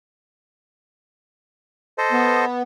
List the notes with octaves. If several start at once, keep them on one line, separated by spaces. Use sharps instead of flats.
A4 C5 D#5
B3